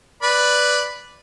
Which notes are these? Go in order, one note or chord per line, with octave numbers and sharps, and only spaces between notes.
B4 D5 B5